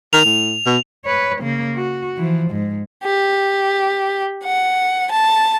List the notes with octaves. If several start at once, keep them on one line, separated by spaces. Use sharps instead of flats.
D#3 F7
A2
B2
B4 C#5
C#3 A#3
F#4
E3 F3
G#2
G4
F#5
A5